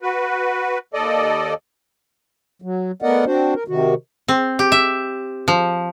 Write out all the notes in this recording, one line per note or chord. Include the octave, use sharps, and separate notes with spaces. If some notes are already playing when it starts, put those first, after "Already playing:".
F#4 B4
D#2 A4 D5 D#5
F#3
A3 B3 A#4 D5 D#5 F#5
C4 D4 F#4 C5
A#4
C3 D#3 F#4
C4
G4
E5
F3